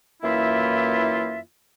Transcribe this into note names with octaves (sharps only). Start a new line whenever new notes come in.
F#2 E3 A#3 E4 F4 E5